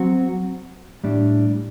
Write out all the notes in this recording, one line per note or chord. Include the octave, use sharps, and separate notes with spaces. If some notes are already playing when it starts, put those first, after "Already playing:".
Already playing: F#3 C4 F#4
A2 G3 D4